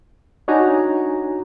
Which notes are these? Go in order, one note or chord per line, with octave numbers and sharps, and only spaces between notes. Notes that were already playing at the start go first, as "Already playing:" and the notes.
D4 D#4 F#4 C#5 G#5 A#5